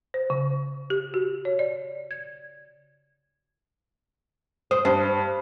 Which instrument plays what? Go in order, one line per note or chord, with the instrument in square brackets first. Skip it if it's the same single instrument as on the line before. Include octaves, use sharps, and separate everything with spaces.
[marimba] C5
C#3
G4
F#4
C#5
D5
G#6
[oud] C5 [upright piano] D#6
[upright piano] G2 [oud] C5